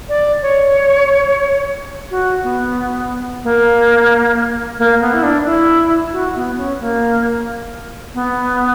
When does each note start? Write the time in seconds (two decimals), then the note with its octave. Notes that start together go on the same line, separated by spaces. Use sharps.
0.09 D5
0.42 C#5
2.11 F#4
2.44 B3
3.44 A#3
4.79 A#3
5.01 B3
5.14 E4
5.23 D4
5.45 E4
6.13 F#4
6.36 B3
6.57 C#4
6.80 A#3
8.14 B3